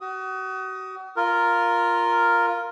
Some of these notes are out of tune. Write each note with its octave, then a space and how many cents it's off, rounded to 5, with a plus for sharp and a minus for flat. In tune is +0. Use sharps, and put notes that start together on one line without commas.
F#4 +35 D#6 +10
F4 +0 A#4 +0